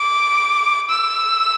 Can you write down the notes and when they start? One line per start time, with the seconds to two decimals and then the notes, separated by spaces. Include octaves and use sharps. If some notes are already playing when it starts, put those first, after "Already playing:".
Already playing: D6
0.90 E6